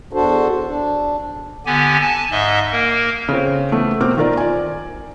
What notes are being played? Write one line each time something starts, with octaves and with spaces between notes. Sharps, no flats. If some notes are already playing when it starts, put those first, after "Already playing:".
E2 D4 F#4 A4 C5
D4
D3 B3 G4 G#5
G#5 A5
G#2 D#5 E5
A#3 A#4
C#3 C4
E3 A3 B3
B2 C4 A#4 D6 F6
D#3 F4 A#4 D5
D5 G#5